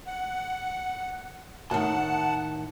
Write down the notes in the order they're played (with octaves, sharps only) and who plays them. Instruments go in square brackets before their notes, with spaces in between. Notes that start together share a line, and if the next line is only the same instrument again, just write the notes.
[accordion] F#5
[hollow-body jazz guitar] A2 D#3 [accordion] F#5 [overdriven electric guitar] A5